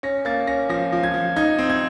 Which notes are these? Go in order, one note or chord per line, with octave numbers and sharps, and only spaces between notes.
C#4 A#6
A#3 A6
C#4 A#6
F3 A#6
F3
G#6
F3
D#4 G#6
C4
G#6